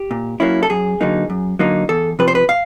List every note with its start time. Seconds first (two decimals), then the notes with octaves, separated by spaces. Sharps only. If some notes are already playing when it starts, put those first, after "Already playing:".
Already playing: G4
0.11 A#2
0.40 F#3 A#3 C#4 E4
0.63 A4
0.70 F#2 G#4
1.01 D3 F#3 A#3 D#4
1.30 F#2
1.59 D3 F#3 A#3 D#4
1.89 E2 A4
2.19 C3 F3 B4
2.28 C5
2.35 B4
2.49 F5